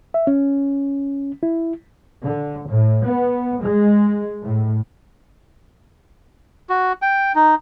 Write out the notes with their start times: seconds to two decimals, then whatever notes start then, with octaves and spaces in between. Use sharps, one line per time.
0.14 E5
0.27 C#4
1.43 E4
2.23 D3
2.68 A2
3.05 B3
3.61 G#3
4.43 A2
6.70 F#4
7.02 G5
7.35 D#4